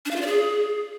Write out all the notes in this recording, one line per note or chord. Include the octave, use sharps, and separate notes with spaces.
D4
F5
F4
D5
G#4